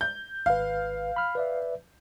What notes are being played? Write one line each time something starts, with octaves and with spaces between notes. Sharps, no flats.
G6
G#1 B4 F5
B5 F6
B4 D5 E5